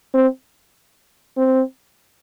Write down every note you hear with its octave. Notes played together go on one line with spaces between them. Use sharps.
C4
C4